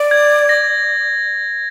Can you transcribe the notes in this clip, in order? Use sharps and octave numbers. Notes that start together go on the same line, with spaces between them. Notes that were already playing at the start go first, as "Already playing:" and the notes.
Already playing: D5
G#6
A#6